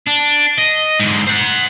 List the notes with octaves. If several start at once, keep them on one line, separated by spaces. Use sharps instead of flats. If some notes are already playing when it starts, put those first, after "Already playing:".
D4
D#5
G#2 D3
C5 F#5